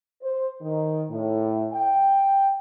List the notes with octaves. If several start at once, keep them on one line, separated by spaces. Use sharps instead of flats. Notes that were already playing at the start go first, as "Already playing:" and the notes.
C5
D#3
A2
G5